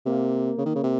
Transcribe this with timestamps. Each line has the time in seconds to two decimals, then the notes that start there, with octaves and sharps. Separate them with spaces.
0.06 C3 A#3
0.58 C#3
0.66 D#3
0.75 C#3
0.84 C3